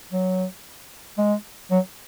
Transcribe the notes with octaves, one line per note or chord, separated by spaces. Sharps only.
F#3
G#3
F#3